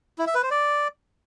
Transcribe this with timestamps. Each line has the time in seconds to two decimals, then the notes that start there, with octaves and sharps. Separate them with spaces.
0.18 E4
0.27 E5
0.35 B4
0.43 C5
0.51 D5